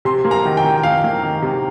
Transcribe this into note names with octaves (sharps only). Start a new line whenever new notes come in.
C3 C6
A#3
A#5
D#3
G5
D#3
D#3 F5
A#3
D#3
C3